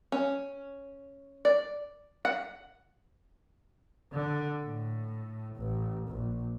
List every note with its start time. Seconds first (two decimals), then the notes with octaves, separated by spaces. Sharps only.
0.12 C#4
1.45 D5
2.25 F#5
4.13 D3
4.64 A2
5.56 A1
6.09 A#1